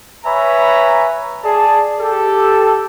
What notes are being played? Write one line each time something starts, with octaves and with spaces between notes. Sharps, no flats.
B4 C#5 E5 G#5 A#5 B5
G#4 D5 A5
G4 A4